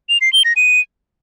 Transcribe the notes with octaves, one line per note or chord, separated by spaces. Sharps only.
F7
C7
G7
A#6
D#7